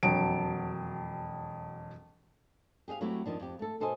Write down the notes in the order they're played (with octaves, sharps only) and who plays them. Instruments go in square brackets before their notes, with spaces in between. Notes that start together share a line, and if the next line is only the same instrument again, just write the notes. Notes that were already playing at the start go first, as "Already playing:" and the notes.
[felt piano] E1 F2 F#3 D7
[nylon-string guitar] G4 G#4 E5 F5
F#3 A3 C4 E4 G4
F2 D#3 F3 D4
F2 G4
A3 A4
B2 A4 C5 D#5 G#5